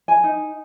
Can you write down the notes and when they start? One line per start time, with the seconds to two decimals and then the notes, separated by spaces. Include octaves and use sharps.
0.08 G#5
0.24 D#4